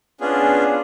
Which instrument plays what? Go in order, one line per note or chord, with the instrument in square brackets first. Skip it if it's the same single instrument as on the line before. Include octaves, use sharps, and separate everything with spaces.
[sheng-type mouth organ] B3 C#4 D4 F4 G#4